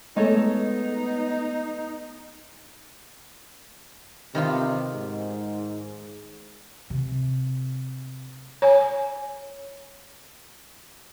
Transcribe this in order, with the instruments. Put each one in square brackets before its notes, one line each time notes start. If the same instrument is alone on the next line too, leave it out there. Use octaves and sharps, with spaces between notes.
[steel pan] G#3 A3 [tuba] B3 [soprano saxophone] D#4 [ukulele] A4 C#5 D#5
[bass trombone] C3 [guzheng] D#3 B3 F4
[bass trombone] G#2
[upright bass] C3
[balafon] C#5 G#5